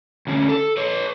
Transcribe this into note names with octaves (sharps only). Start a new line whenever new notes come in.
D2 C#4
A4
B4 C#5